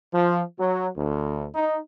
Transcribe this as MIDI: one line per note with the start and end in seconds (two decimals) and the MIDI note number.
0.14 0.42 53
0.59 0.88 54
0.97 1.47 38
1.55 1.77 63